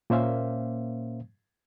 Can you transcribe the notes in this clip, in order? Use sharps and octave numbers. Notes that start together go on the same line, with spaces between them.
A#2 A#3 C#4 C5 E5 F5